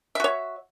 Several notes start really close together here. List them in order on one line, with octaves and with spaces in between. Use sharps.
E5 F#4 C#5